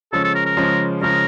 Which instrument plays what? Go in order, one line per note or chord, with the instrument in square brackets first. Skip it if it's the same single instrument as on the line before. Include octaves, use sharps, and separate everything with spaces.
[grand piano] C#3 F3 G#3 C#4 [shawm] A4
[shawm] A4
A#4
A#4
[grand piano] C#3 F3 G#3 C#4
[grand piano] C#3 F3 G#3 C#4 [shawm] A#4